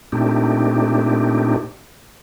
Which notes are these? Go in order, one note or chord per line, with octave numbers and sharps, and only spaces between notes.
A#2 A3 C4 D4 D#4 G4